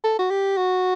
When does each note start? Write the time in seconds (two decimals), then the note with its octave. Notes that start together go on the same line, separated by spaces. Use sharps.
0.04 A4
0.19 F#4
0.31 G4
0.57 F#4